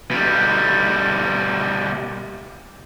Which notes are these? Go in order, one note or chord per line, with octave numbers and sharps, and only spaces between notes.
B2 G3